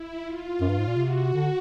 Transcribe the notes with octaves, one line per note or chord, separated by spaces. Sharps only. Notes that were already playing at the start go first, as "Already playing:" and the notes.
Already playing: E4
F4
F#2
G2
G#2
A#2
C3 F#4
D3